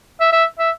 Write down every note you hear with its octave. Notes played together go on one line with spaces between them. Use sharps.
E5
E5
E5